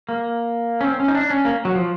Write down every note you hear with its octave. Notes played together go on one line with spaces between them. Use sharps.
A#3
C#4
C4
C#4
D#4
D4
C#4
A#3
F#3
F3